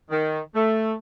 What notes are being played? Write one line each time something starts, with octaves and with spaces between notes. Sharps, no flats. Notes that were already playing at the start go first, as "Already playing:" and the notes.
D#3
A3